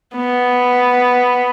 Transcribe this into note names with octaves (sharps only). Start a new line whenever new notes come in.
B3